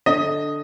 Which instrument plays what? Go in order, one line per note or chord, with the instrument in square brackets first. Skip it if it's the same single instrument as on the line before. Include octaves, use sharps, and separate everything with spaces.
[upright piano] D3 D#5